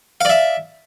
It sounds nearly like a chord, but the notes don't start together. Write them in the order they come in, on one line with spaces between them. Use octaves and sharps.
F5 D5 E5